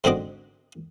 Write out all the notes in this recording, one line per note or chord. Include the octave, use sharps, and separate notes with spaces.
G#2 D3 C4 F#4 D#5 D6